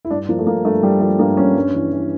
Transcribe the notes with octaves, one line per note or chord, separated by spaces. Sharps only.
E4
G2 D4
F3 A#3
A3
G2 A#3
G2 A3
F3 G3
F3 A3
G2 A#3
G2 C#4
G2
E3
E3